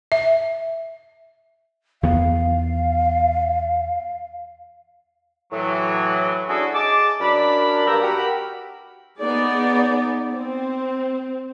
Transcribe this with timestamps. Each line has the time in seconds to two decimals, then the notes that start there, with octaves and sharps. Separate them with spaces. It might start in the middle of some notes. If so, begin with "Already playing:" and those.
0.12 E5
2.03 E2 D#3 B3 F5
5.51 A2 E3 F#3
6.47 C#4 D4 E4 F#4 G#4 A4
6.74 G#4 D#5 A5 D6
7.20 F#2 D4 A#4 D5 B5
7.87 G2 A#3 G5 A#5 E6
8.01 F#4 G4 A#4 B5
9.19 B3 D#4 G#4 D5
10.32 C4